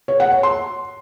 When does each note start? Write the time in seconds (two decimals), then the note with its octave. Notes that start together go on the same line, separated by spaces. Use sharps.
0.08 C#5
0.20 F#5
0.32 C#5
0.43 C6